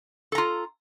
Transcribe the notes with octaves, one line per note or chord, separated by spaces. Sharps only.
F4 A4 A#5